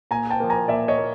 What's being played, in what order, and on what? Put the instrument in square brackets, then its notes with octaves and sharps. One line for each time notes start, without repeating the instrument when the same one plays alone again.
[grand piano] A#2 G#5 A#5
G5 A5
F3 A#3
G#5 A#5
A#2 D5 E5
C#5 D#5
A#3